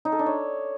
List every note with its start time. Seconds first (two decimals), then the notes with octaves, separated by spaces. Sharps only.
0.05 D#4
0.12 A4
0.19 D4
0.26 C#5